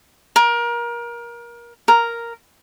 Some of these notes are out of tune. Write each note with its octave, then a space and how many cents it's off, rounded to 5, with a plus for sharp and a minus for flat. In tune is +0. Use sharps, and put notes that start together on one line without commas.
A#4 +25
A#4 +0